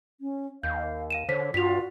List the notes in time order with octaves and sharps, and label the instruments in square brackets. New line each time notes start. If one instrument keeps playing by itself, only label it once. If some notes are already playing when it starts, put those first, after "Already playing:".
[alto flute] C#4
[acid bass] D#2 [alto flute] F5 [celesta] G6
[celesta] F5 D#7 E7
[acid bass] D3 [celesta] C5 B6 [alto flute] C#5
[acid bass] G2 [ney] F4 [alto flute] F#4 [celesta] B6 F7